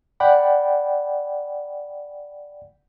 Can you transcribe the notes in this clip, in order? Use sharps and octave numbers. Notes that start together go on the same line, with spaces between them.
D5 F#5 G5 B5